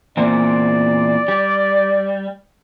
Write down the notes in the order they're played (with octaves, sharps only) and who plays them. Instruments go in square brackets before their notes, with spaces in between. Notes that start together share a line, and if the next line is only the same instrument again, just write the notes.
[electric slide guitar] E2 A#2 C4 [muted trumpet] D5
[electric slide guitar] G3